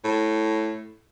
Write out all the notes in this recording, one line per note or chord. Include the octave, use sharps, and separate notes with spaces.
A2